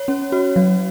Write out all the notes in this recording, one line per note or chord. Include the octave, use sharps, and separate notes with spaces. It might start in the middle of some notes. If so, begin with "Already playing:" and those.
Already playing: C#5
C#4
F#4
F#3